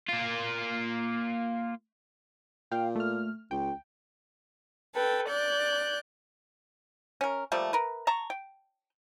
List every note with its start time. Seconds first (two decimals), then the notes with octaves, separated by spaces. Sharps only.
0.08 A#3 F4
2.72 A#2 F5 G5
2.96 A3 F6
3.51 C#2 G5
4.95 A4 B4 G5
5.29 D5 F#6 G6
7.21 C#4 A#4
7.52 F3 G3 A3 A#3
7.73 A#4 B4
8.07 A5 A#5 C#6
8.30 G5